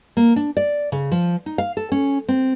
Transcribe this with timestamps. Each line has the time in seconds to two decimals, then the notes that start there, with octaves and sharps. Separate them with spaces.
0.17 A#3
0.36 D4
0.57 D5
0.92 C#3
1.11 F3
1.46 D#4
1.58 F5
1.77 A4
1.92 C#4
2.28 C4